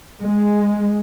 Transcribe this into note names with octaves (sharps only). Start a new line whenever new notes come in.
G#3